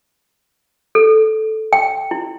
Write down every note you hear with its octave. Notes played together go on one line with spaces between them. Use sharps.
A4
G5
E4